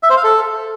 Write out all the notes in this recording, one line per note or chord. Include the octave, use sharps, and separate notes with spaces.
E5
C5
F5
A4